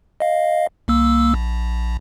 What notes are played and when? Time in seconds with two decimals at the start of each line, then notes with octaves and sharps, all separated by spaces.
0.20 D#5 F5
0.88 C2 A#3 E6
1.34 A#1